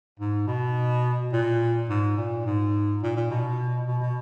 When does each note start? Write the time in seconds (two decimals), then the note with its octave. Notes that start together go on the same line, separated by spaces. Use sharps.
0.19 G#2
0.47 B2
1.32 A#2
1.89 G#2
2.17 A#2
2.45 G#2
3.03 A#2
3.16 A#2
3.30 B2
3.87 B2
4.02 B2